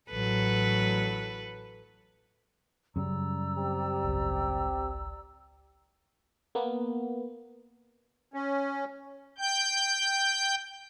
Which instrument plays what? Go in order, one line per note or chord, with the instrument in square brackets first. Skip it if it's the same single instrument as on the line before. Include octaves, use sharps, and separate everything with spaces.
[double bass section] A1 F#3 [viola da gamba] A4 B4
[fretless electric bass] F#2 C#3 G3 [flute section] D5 A#5 E6
[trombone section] C4 G4
[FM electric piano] G#1 C#2
A#3 B3
[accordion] C#4
[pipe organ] G5 G6